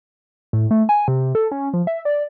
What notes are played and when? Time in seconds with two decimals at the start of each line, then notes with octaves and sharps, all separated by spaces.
0.53 A2
0.71 A3
0.89 G#5
1.08 C3
1.35 A4
1.51 C#4
1.74 F3
1.87 E5
2.05 D5